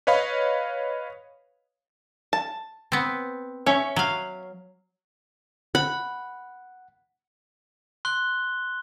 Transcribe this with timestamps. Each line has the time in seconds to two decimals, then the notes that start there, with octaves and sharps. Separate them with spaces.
0.07 B4 C#5 D#5 F5 B5
2.33 A5
2.92 B3 C4
3.66 C#4 C#5 E5
3.96 F#3 F5
5.75 F#5 B5
8.05 C6 F#6 G7